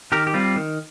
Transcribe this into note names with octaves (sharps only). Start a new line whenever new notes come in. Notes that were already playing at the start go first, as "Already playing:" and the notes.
D#3 G4 A#4
G4
G3 C4 F4
D#3